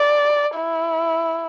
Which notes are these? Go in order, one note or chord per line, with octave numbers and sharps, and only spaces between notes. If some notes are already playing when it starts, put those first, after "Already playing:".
Already playing: D5
E4